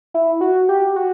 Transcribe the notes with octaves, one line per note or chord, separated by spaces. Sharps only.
E4
F#4
G4
F#4